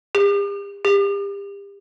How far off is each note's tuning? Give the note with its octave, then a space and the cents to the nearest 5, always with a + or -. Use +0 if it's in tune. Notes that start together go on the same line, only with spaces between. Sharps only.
G4 +45
G4 +35